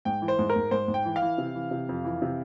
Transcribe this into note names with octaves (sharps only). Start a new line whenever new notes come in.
G#2 G5
E3
C5
G#2
A#4
G#2
G#2 C5
G#2
G5
E3
F5
E3
C3
E3
C3
F2
E3
C3